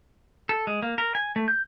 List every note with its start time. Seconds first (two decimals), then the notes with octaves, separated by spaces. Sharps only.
0.49 A4
0.67 G#3
0.82 A#3
0.98 A#4
1.15 G#5
1.36 A3
1.48 G6